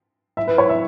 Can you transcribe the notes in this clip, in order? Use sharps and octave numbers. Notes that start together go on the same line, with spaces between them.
E5
B4
C#5
E5